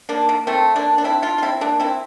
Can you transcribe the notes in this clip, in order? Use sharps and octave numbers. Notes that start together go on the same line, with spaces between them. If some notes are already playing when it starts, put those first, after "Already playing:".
A#3 D4
A#3
A3 C4
A#3 D4
D4
C4 E4
D4 F4
F4
C4 E4
A#3 D4
C4 E4